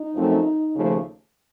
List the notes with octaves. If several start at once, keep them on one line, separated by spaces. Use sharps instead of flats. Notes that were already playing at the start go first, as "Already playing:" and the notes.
Already playing: D#4
F#2 F3 A3 C4
D#2 C#3 F3 A3